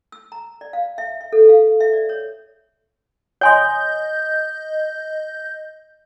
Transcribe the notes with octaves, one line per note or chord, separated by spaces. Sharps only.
E6
A#5
D5
F5
E5
E5
A4
F5
E5
D5
C#5
C#5 D#5 G#5 C6 G6